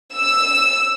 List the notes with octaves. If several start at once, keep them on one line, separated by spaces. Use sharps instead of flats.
E6